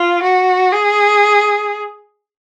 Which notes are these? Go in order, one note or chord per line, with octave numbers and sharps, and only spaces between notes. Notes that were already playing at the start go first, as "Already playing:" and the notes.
Already playing: F4
F#4
G#4